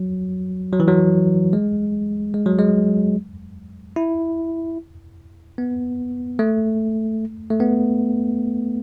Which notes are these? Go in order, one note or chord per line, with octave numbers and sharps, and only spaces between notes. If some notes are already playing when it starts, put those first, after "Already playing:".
Already playing: F#3
F#3
E3
F#3
G#3
G#3
F#3
G#3
E4
B3
A3
A3
B3